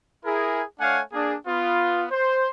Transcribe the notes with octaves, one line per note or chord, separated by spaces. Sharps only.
E4 G#4 A#4
A3 D4 C#5 F5 F#5 G#5
A#3 D4 G#4
B3 F4
C5